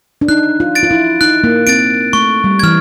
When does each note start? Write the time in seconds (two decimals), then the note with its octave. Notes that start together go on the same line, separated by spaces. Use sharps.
0.21 D4
0.29 D#4 F#6
0.60 F4
0.75 A6 D7
0.83 F4
0.91 E4
1.21 D#4 F#6
1.44 A#3
1.67 C4 A6 D7
2.13 A3 C#6
2.44 G3
2.59 E3 F6 G#6